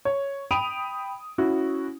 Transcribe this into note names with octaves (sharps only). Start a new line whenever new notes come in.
C#5
G5 B5 D#6 D7 D#7 F7
C#4 E4 F#4